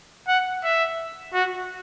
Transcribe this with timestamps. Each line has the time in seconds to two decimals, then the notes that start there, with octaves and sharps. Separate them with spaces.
0.28 F#5
0.63 E5
1.33 F#4